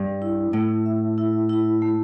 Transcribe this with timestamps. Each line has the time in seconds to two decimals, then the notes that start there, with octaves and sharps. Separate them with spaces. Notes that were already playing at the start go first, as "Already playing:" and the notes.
Already playing: G2
0.22 E4
0.53 A2 E4
0.86 E5
1.18 E4
1.49 E4
1.82 A3